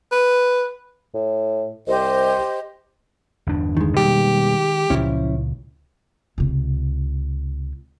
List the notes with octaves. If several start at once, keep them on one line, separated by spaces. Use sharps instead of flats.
B4
A2
C2 G4 C5 D#5
G1 E2 D4
D#3 G#3
B2 G3 A#3 G4
C#2 A#2 F3 C#4 E4
C#2 C3